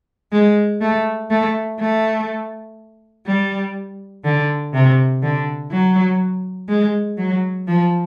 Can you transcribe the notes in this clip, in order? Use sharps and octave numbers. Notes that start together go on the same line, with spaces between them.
G#3
A3
A3
A3
G3
D3
C3
D3
F#3
G#3
F#3
F3